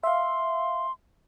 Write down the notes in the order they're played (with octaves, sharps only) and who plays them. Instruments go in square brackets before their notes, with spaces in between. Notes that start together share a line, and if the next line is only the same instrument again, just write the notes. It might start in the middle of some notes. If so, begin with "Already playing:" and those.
[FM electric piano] E5 F5 [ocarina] C6